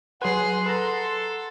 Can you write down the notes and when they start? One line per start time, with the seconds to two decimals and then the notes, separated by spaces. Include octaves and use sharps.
0.22 F#3 G#4 B4 F#5 C6
0.66 A4 B4 A#5